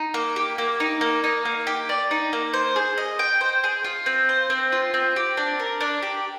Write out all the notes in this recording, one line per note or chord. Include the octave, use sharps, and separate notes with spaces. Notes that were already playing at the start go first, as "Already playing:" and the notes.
Already playing: D#4
A#3
G4
A#3
D#4
A#3
D#4
A#3
G4
D5
D#4
A#3
C5
G#4
D#5
G5
C5
G#4
F4
C4
C5
C4
F4
C4
G4
D4
A#4
D4
G4